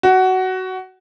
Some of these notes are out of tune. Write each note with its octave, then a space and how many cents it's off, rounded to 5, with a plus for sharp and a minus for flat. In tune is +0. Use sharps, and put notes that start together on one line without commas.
F#4 +15